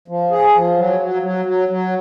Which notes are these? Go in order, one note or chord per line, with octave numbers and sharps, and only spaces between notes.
F3
G#4
F3
F#3
F#3
F#3
F#3
F#3